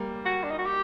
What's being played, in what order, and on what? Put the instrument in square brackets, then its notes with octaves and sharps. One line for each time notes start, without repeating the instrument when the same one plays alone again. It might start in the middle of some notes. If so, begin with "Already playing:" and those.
Already playing: [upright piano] G3 A#3
[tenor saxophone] F#4
D4
D#4
F#4
G4